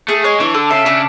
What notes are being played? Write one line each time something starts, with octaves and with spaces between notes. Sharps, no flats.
A3 G#4
G#3 C#5
E3 D4
D3 A4
C#3 E5
C#3 D4